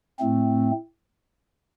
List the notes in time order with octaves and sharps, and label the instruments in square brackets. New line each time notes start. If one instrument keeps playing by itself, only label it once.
[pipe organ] A2 A3 C4